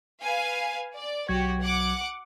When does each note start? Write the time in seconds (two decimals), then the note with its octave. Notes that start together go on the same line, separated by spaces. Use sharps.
0.22 B4 F5 G#5
0.96 D5
1.29 B1 F#3 F#4 G4 G#6
1.62 F#5 D6